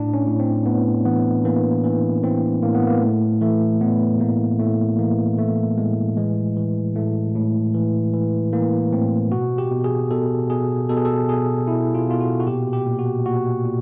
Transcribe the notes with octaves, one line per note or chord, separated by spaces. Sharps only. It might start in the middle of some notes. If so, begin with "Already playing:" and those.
Already playing: A2 D4
C#4
A2
C4
A2 B3
E3 B3
E3 A#3
E3
E3 C4
A2 A#3
B3
A#3
A2 A3
E3 A3
A2 B3
A2 A#3
A2 A3
E3 A#3
E3 A3
A2 G#3
E3 G#3
E3
A2 A3
A2
E3
E3
E3 A#3
A2 C4
B2 F#4
G4
B2
G#4
B2 A4
B2 G#4
B2 A4
G#4
A4
B2 G#4
B2 E4
F4
B2 F4
F#4
F#4
A#2 G4
G4
A#2
F#4
A#2 F#4
A#2